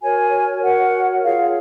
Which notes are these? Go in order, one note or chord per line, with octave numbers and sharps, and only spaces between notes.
F#4 A#4 C#5 G#5
F#4 A#4 C#5 F#5
F4 G#4 C#5 F5